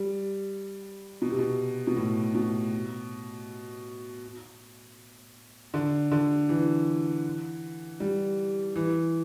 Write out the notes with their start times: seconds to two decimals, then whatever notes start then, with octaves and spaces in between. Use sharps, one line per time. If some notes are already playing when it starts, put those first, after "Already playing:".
Already playing: G3
1.22 B2
1.30 C3
1.39 B2
1.87 B2
1.97 A2
2.35 B2
5.74 D3
6.11 D3
6.49 E3
8.00 G3
8.76 E3